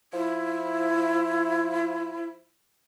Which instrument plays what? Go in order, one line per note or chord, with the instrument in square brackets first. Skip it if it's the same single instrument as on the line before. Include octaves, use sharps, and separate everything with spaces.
[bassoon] F3 [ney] E4